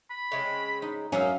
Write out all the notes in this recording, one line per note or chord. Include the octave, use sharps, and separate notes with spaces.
B5
C#3 G#3 C4
D#4
F#2 A#3 C#4 D#4 E5 F5